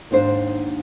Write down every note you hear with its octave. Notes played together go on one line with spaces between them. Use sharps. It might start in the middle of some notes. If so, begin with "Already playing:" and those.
D#2 G#2 D4 C5